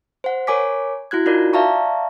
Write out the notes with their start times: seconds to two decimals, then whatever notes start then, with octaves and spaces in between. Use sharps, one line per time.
0.24 C5 F#5
0.47 A#4 C#5 G#5 D6 B6
1.11 E4 F#4 F#6 G#6
1.26 D#4 F4 F#4 A#4 D5
1.53 D5 E5 F5 A5 A#5 C#6